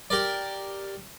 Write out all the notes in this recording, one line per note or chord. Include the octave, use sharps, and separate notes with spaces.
G4 A#4 D5